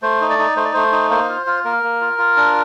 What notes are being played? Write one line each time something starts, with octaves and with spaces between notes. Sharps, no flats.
A3 C5
D#4
D5
D#4
A3 C5
D5
A3 C5
D#4
A#3 C5
F4
F4
A#3 A#4
A#3
F4
F4
D4